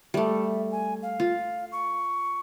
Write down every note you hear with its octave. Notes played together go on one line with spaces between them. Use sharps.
G3 A3 E5
G#5
F5
F4
C#6